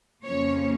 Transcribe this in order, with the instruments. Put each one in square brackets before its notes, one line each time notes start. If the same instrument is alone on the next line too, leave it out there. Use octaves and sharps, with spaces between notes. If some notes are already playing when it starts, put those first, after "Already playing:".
[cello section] F2 C#3 F3 A#3 C#4 C#5